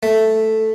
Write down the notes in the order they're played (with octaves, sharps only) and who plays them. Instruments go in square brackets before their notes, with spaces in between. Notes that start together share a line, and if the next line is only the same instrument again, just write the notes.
[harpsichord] A3